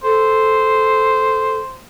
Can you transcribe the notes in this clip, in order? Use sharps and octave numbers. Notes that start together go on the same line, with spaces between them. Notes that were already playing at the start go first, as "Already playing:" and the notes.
A4 C5